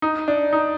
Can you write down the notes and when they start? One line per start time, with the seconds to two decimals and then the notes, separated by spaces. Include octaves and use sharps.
0.02 D#4
0.28 D4
0.53 D#4